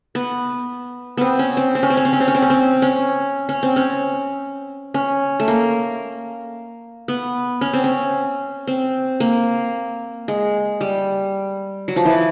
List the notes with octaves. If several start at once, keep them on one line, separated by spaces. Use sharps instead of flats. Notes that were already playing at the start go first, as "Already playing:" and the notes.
B3
B3 C4
C#4
C4
C4
C#4
C4
C#4
C4
C#4
C4
C#4
C4
C#4
C4
C#4
C#4
C4
C#4
C#4
A3
A#3
B3
C#4
C4
C#4
C4
A#3
G#3
G3
F#3
F3
E3